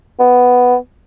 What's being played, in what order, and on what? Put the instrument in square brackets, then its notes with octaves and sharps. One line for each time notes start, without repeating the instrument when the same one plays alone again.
[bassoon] B3